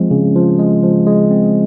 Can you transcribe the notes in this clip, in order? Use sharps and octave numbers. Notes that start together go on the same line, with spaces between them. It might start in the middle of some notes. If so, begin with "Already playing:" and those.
Already playing: F3 G#3 C4
C#3
F3
G#3
F3
G#3
C4